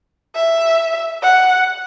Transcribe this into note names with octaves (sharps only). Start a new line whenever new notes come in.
E5
F#5